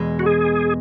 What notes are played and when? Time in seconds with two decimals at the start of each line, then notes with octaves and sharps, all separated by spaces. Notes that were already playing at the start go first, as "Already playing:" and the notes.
Already playing: E2 B2 G#3
0.19 F#4
0.26 G#4